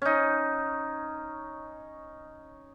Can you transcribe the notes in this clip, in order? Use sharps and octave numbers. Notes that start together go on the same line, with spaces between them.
C#4 D#4